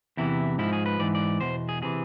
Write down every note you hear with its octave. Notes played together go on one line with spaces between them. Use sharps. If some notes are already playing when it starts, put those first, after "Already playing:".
E2 C3 E3 E4
G#2 F3 E4
G#4
B4
G#2 E3 D5
D5
E2 B2 C5
G#4
C3 E3 G#4